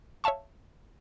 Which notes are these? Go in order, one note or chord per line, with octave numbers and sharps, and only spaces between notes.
C#5 E5 F5 A5 C#6